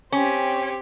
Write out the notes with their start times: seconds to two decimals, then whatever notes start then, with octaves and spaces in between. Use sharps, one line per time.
0.12 C4 C#4 G4